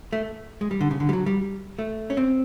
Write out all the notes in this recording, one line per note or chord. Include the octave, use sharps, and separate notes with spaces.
A3
G#3
G3
D3
C#3
D3
G3
F#3
G3
A3
C#4
C4